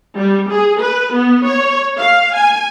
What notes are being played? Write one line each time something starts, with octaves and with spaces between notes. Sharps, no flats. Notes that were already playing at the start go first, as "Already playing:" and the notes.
G3
G#4
B4
B3
C#5
F5
G#5